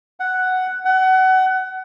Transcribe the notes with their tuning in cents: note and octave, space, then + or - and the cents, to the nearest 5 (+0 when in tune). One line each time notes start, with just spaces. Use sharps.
F#5 +5
F#5 +25